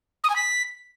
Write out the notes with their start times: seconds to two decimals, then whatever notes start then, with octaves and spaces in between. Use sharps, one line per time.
0.24 D#6
0.30 G#5
0.36 B6